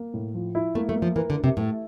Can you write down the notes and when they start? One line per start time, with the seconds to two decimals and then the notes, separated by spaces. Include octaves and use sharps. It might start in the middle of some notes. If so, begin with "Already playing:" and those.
Already playing: A#3
0.14 A2
0.34 F3
0.55 E4
0.75 A3 A#3
0.89 A3
0.95 A#3
1.02 F3
1.16 E3 A#4
1.30 D3
1.37 A#4
1.44 C3
1.57 A2 A3